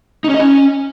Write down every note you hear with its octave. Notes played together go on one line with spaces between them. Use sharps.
D#4
C#4
D#5
C#4